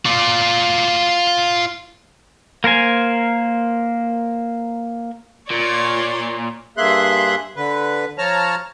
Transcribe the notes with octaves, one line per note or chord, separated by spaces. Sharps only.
F4 D5
A#3 A#4 C5 G#5
A#2 C#5 D5 C6
G2 A#3 G#4 E5 C6 F#6
D3 B4
F3 C#5 A5 A#5 F6